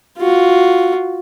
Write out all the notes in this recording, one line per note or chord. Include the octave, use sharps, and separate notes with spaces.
F4 F#4